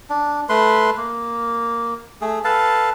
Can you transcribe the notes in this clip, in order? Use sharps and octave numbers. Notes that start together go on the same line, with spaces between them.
D4
A3 B4 C6
A#3
A3 G#4
A4 B4 F5 A5